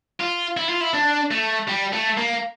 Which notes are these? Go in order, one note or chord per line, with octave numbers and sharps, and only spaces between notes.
F4
E4
F4
E4
D4
A3
G3
A3
A#3